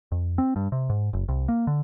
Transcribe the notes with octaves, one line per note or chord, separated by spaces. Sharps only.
F2
C4
G2
C3
G#2
F#1
C2
A#3
D3